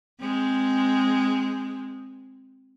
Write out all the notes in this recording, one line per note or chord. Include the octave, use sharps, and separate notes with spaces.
G#3 C4